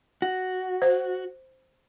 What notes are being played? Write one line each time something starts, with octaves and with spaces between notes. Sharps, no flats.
F#4
C5